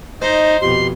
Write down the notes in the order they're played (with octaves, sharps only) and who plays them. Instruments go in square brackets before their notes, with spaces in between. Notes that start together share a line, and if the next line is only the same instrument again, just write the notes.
[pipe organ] D#4 [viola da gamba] C5 [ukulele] D#5
[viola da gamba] F2 B2 [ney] G4 [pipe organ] C6